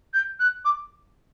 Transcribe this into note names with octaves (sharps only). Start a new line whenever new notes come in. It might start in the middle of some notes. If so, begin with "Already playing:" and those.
G6
F#6
D6